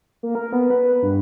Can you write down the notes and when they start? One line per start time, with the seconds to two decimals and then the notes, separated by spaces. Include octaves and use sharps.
0.23 A#3
0.35 A#4
0.53 B3
0.70 B4
1.02 G2